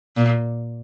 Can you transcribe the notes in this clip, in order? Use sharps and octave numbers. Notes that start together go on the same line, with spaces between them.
A#2